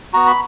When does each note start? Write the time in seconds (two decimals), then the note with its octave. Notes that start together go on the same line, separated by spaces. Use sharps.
0.13 B3 F#4 A#5
0.27 B5